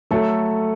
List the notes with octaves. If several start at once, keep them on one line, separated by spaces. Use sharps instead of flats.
F#3 A3 A4